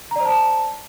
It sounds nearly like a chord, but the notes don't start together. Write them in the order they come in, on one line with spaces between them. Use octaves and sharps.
A#5 D5 C5 A5